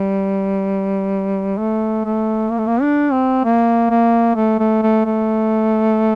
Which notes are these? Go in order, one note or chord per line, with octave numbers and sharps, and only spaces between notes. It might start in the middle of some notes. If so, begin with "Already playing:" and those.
Already playing: G3
A3
A3
A#3
A3
A#3
D4
C4
A#3
A#3
A3
A3
A3
A3